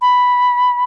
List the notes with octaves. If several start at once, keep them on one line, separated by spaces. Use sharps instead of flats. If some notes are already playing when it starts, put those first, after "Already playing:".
B5